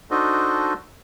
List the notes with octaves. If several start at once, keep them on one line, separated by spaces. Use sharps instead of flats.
D4 D#4 F#4 A4 C5 D#5